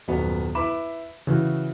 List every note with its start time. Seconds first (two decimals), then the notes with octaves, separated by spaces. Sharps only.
0.08 D#1 F#2 B3 F#4 D5
0.55 E4 B4 B5 D6 E7
1.27 C#3 E3 F#4